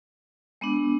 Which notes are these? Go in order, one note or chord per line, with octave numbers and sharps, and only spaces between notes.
G#3 B3 D4